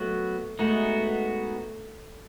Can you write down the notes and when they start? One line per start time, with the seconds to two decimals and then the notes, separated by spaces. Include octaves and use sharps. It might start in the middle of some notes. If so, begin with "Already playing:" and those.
Already playing: F#3 A3 B3 F#4
0.59 G#3 A3 B3 D#4 F#4